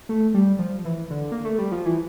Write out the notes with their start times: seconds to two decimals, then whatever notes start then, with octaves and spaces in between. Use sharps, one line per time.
0.09 A3
0.34 G3
0.59 F3
0.85 E3
1.10 D3
1.32 A#3
1.45 A3
1.59 G3
1.72 F3
1.86 E3